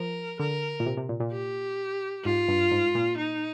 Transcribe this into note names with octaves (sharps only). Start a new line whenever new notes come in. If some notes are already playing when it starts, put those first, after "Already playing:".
Already playing: F3 A#4
D3 A#4
A#2
C3
C3
A#2
A#2
G4
G#2 F4
G2
G#2
A#2
D#4